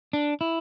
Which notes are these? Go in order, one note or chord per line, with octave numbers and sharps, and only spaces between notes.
D4
E4